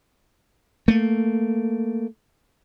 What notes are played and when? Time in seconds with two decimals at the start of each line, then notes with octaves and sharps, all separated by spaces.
0.88 A3 A#3